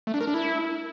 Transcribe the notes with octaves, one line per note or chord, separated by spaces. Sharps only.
A3
D4
A#4
D4
E4